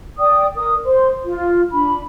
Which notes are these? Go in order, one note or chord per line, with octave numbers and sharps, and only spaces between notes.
D5 G5 D#6
A#4 D#6
C5 C6
F4
D4 B5